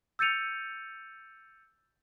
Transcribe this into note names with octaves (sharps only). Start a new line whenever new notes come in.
E6 G6 A6 C#7 D#7 F7